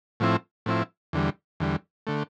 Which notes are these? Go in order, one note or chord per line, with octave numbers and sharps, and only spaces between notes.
A2 F3 C4 E4
A2 F3 C4 E4
E2 D3 G3
E2 D3 G3
D3 A3